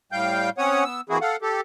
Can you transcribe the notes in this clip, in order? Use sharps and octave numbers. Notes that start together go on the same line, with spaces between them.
A2 G3 F5 G5 G6
C4 C#4 C#5 F#5 D#6
B3 E6
E3 A#3 C4 E4 F#4 G#4
A4 F5 F#5
G4 A4